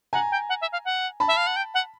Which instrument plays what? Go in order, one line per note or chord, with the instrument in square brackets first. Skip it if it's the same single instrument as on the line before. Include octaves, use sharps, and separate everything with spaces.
[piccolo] F#5 [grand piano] G#5 A#5
[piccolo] G5
F#5
E5
F5
F#5
[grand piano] A5 B5
[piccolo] E5
F5
F#5
G5
F#5